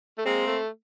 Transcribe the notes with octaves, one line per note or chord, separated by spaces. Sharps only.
A3
G#3 A#3 C4
A3